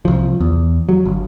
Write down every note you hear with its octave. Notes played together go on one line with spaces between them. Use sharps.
C2 F3
E2
F#3
G1